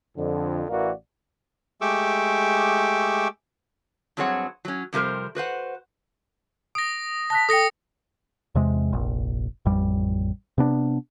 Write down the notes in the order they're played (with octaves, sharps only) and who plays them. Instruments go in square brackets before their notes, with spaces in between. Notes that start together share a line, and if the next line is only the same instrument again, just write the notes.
[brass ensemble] F2 D3
A1 E3 F#4 A#4 D5 F5
[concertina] G#3 A3 G4 C#6 D6 E6
[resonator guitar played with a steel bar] G2 F#3 C4 G#4 C#5 F#5
F#3 C#4
F2 C3 G3 A#4 C5
F#4 B4 C5 F#5
[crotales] D#6 A#6 [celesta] D7
[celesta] A5 F#6 B6 [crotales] A#6
[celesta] A4 G5 [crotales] D#6 A#6 C#7
[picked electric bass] E2 C3 G#3
F1 A#1
A1 F2 G3
C3 B3 D4